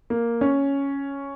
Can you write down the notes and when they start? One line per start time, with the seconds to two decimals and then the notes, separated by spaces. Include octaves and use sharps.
0.10 A#3
0.41 C#4